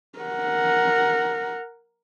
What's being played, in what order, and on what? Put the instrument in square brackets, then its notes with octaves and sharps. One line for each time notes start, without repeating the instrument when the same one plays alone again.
[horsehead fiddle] A#4 F#5